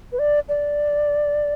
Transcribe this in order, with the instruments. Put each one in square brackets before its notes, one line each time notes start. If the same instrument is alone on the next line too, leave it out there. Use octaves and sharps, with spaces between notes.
[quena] B4
D5
D5